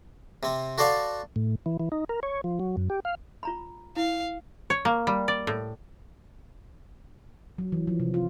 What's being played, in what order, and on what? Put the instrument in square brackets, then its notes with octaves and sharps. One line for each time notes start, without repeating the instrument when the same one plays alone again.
[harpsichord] C3 C4
F#4 A4 C5 D5 F5 F#5
[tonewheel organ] A2
E3
E3
D#4
A#4
C#5
F3
F#3
F#2
G4
F5
[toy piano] F4 A#5 B5
[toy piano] E4 [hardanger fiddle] F5
[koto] C#5
A#3
G3
D5
A2
[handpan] F#3
E3
F3
C3
F4